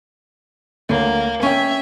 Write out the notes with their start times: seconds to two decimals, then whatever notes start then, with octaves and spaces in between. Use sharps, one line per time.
0.89 D2 A#3 C#5
1.43 C#4 E5 G5 G#5